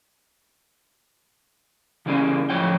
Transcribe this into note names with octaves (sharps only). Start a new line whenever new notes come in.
C#3 E3 G3 A#3 C#4 G#4
A2 D3 F3 C#5 G5